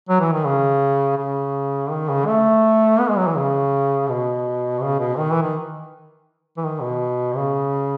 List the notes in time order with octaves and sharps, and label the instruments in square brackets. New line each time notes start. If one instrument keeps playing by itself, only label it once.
[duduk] F#3
E3
D#3
C#3
C#3
D#3
C#3
A3
B3
G#3
F#3
E3
C#3
B2
C#3
B2
D#3
E3
D#3
E3
D#3
B2
C#3